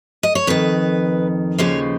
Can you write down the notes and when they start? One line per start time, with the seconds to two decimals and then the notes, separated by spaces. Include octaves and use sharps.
0.23 D#5
0.35 C#5
0.47 F2 D#3 B4
1.59 D#2 C#3 F3 C#5